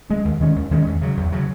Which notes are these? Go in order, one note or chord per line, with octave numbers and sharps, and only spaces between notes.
G#3 C#4
D#2
D#3 G#3 C#4
D#2
D#3 G#3 C#4
E2
C#3 F#3
E2
C#3 F#3